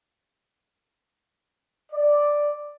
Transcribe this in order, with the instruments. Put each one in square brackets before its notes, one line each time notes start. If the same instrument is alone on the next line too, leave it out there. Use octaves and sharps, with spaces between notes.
[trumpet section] D5